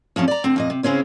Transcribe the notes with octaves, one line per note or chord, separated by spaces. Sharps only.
E2 F3 C4 C#4
D5 A#5
D3 C4
F2 A#2 D#5
C3
C#3 G#3 C4 C#4 E4